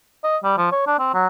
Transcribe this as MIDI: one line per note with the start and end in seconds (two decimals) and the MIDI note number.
0.24 0.37 75
0.43 0.53 55
0.57 0.67 53
0.72 0.82 73
0.87 0.96 62
0.99 1.12 60
1.14 1.27 54